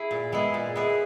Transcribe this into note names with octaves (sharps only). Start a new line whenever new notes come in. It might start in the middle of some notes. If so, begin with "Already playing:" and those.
Already playing: E4 G#4
A#2
G#3 B3 E4 G#4
A#2
G#3 B3 E4 G#4